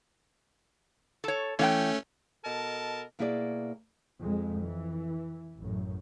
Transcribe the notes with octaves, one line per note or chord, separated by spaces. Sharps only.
A4 C#5
E3 A3 C#4 F5 G5
B2 A4 A#4 D#5 A5
B2 A#3 E4 G#4 C5 D5
F2 G#3
E3
A1 F#2 A2